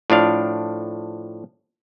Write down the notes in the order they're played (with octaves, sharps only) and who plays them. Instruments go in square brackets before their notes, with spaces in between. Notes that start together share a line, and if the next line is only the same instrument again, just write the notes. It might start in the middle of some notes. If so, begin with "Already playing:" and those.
[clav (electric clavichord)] A2 F3 D4 F5